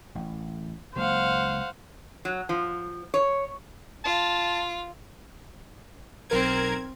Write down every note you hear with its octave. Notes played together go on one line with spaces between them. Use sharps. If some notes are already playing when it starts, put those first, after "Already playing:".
A1
C#2 F#3 A#3 C5 F5 F#5
F#3
F3
C#5
F4 A5
B1 C4 A#4 G#6